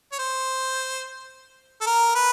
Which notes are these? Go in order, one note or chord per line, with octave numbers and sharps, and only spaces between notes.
C#5
C5
A4
A#4
B4